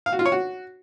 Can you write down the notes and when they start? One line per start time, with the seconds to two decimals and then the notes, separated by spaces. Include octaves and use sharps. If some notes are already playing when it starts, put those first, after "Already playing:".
0.06 F5
0.13 F#4
0.19 F4
0.26 C#5
0.32 F#4